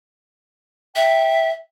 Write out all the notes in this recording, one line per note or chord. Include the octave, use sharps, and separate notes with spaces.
E5 G5